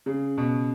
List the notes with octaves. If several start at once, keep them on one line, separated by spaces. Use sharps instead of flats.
C#3
B2